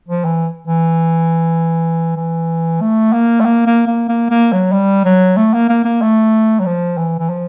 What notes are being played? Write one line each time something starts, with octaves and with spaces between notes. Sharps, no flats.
F3
E3
E3
E3
A3
A#3
A3
A#3
A#3
A#3
A#3
A#3
F#3
G3
F#3
A3
A#3
A#3
A#3
A3
F#3
F3
E3
E3
F3